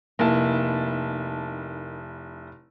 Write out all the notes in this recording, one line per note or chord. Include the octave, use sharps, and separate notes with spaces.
F1 A#3 D#4 E4 A5